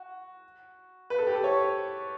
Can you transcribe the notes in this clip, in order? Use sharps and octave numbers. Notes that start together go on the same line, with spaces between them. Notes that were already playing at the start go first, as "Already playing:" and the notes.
Already playing: F#4
B4
A4
G4
A4
C#5